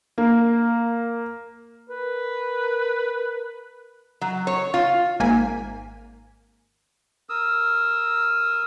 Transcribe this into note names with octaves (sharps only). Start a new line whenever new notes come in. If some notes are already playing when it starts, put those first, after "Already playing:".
A#3
A#4 B4
F#3
C#5
F4
G#1 A#3 G#5 B6
A#4 D#6 E6